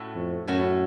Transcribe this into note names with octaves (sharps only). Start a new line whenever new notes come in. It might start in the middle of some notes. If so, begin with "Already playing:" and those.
Already playing: A2 A3 C#4 F#4
F2
F#2 A2 A3 C#4 F#4